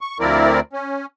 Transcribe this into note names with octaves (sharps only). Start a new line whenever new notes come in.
C#6
D2 F3 C4 E4 A#4 D5
C#4